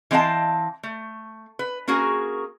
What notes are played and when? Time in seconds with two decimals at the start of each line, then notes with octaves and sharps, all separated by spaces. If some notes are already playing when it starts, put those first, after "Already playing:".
0.11 E3 C4 D#5 F5 A5
0.83 A3
1.59 B4
1.87 A#3 C#4 F#4 G#4 A#4